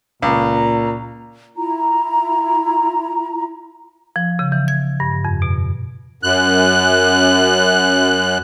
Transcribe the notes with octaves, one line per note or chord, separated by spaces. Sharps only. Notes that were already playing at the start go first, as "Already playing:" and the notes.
C#2 A#2 A#5
E4 F4 A#5
F3
C#3
E3
G#6
G2
F2
B2
F#2 F#6